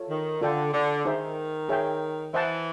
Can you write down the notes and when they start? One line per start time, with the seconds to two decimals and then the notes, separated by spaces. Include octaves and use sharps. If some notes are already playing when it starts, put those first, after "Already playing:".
Already playing: F4 A4 C#5
0.09 D#3
0.41 D3 F4 A4 D5 G5
0.73 D3
1.05 D#3 D#4 G#4 C5 E5
1.69 G#4 C#5 E5 G5
2.34 E3 C5 D#5 F#5 A5